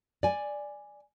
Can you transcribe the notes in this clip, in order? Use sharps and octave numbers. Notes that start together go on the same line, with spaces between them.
D5 G#5